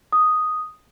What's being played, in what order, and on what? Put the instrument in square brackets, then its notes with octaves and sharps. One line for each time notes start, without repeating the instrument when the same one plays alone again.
[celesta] D#6